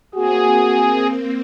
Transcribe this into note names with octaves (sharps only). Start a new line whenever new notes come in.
A#3 C4 F#4 G#4